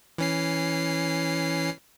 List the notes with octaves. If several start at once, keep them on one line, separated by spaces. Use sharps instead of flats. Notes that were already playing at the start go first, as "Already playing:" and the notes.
E3 C#4 C7